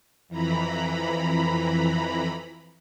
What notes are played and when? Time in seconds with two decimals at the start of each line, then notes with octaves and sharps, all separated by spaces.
0.28 F2 E3 A#5 B5